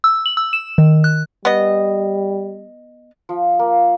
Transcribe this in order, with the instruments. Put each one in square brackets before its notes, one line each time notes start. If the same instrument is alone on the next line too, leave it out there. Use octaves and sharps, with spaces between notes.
[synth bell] E6
F#7
E6
E7
D#3
F#6
[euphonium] G3 [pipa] B3 D#5
[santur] F3
A#3